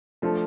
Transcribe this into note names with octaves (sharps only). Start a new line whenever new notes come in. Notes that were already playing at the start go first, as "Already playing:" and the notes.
F3 A3 D4 A4